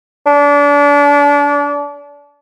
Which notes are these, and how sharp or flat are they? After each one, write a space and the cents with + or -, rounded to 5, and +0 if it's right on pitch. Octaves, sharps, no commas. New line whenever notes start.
D4 -30